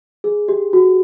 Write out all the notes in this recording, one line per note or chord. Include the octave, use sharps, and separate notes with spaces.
G#4
G4
F#4